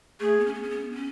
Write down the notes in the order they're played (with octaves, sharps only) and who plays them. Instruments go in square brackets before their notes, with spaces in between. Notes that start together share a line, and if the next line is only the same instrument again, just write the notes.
[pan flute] A3 [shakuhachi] G#4
[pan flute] B3
C#4
B3
C#4
B3
D4
C#4